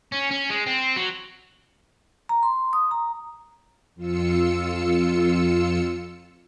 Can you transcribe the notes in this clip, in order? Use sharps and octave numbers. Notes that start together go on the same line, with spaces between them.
C#4
C#4
G#3
C4
F#3
A#5
C6
D#6
A#5
F2 F4 E6 C#7